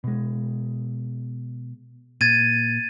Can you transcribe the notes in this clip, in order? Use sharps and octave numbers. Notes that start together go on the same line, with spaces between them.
B2 G#3
A#2 G#6 A6 D#7